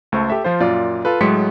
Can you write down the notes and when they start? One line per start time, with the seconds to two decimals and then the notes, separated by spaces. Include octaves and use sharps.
0.12 C#2 A3 A4 C5 C#6
0.30 G4 A4 E5
0.44 F3 F4 C5
0.61 F#2 A#2 F4 D5
1.05 F4 A4 B4
1.21 A2 F#3 G#3 C6 B6 C#7